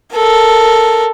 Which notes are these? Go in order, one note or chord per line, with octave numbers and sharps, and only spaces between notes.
A4 A#4